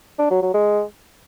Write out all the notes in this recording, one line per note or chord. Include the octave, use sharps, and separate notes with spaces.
D4
F#3
F#3
G#3